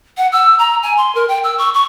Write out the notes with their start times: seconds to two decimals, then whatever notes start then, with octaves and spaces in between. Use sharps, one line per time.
0.17 F#5
0.32 E6
0.59 A#5
0.83 G#5
0.97 C6
1.15 A#4
1.28 G5
1.44 E6
1.58 C#6
1.74 C#6